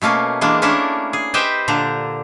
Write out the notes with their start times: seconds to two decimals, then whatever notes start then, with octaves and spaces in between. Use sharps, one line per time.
0.02 B2 A3 A#3 C#4
0.41 E3 G#3 A#3 D4
0.62 A3 A#3 C#4 D4 E4 A#4
1.13 G#4
1.34 G4 B4 C5 D#5 E5 G5
1.68 A#2 D3 D4 A#5